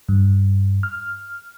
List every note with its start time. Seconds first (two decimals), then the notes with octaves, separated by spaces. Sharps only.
0.09 G2
0.83 F6